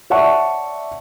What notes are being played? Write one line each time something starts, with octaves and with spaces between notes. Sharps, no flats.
C#5 D5 E5 F#5 A5 C#6